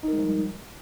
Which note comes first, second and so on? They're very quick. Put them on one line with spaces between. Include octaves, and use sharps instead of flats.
D#4 A#4 G#3 F3 G3